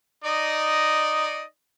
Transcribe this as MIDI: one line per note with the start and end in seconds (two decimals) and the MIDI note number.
0.24 1.42 63
0.24 1.42 74
0.24 1.42 75